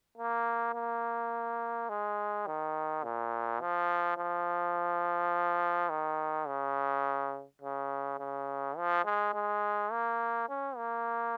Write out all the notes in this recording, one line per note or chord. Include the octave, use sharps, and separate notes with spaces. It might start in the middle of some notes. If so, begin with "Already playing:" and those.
A#3
A#3
G#3
D#3
A#2
F3
F3
D#3
C#3
C#3
C#3
F3
G#3
G#3
A#3
C#4
A#3